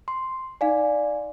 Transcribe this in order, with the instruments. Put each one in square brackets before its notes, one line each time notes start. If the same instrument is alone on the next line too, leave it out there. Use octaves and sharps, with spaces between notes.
[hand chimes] C6
[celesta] D#4 F5 G#5 [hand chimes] D5